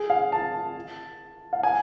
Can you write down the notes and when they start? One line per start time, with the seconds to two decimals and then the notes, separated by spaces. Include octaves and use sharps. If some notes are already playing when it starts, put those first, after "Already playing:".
Already playing: G#4
0.10 F5
0.32 A5
1.53 F5
1.63 G#5